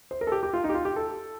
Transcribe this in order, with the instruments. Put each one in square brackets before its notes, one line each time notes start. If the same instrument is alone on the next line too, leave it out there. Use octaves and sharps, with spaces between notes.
[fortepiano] C5
A#4
A4
G4
G4
F4
D#4
G4
F4
G4
A4